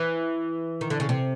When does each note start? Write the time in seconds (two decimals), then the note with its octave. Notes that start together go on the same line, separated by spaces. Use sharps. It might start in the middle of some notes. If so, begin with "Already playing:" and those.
Already playing: E3
0.81 D#3
0.90 D3
1.00 C#3
1.09 C3